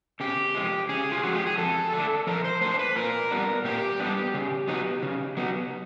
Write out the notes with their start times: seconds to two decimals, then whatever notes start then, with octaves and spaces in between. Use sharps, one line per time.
0.20 C#3 G4
0.55 F3 G#3
0.89 C#3 G#4
1.12 F4
1.23 F3 G#3 F#4
1.35 G4
1.47 G#4
1.58 F3 A4
1.93 A3 D4
2.27 F3 A#4
2.44 C5
2.61 A3 D4 C5
2.79 B4
2.96 A#2 A#4
3.31 G3 B3 D4
3.64 A#2 G4
4.00 G3 B3 D4
4.34 C#3
4.68 F#3 B3 D#4
5.03 C#3
5.37 F#3 B3 D#4